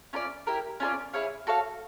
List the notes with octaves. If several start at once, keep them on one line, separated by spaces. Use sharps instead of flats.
C#4 F4 A#4 D5
E4 G4 A#4
C#4 F4 A4 D5
E4 G#4 C#5 F5
F#4 A4 C#5 F5